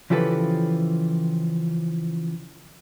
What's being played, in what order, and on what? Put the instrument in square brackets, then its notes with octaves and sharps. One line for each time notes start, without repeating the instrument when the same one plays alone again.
[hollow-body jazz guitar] C#3 E3 F3 G4 A4 B4